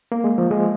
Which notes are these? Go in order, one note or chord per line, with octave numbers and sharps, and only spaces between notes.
A#3
G#3
F3
G#3